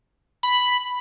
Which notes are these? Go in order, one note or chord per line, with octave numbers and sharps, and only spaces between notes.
B5